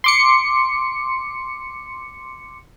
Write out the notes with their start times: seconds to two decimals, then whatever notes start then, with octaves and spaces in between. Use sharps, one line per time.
0.04 C6 D6 C#7